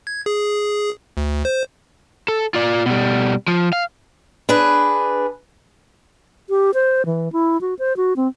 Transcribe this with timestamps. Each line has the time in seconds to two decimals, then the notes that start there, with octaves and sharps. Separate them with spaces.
0.07 G#6
0.26 G#4
1.17 D2
1.45 C5
2.28 A4
2.54 F4 D5
2.86 B2 G3
3.48 F3
3.73 F5
4.49 D4 G#4 B4
6.49 G4
6.74 C5
7.06 E3
7.33 E4
7.61 F#4
7.79 C5
7.97 F#4
8.16 C4